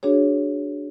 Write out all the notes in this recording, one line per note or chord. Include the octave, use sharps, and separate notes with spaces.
D4 F#4 G#4 C#5